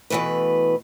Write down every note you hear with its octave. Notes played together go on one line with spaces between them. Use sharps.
B2 D#3 E3 A3 B4